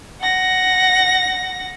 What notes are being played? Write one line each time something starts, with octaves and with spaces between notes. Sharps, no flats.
F#5 A#6